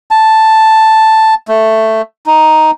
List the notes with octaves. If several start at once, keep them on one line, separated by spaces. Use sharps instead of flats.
A5
A3
D#4